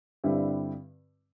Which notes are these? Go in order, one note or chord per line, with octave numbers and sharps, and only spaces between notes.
G2 D3 G3 C4 E4